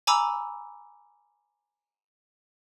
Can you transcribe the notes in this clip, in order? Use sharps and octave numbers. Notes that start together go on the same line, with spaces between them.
G#5 A#5 B5 D6 E6